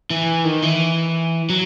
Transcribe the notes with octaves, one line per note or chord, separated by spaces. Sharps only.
E3
D#3
E3
F#3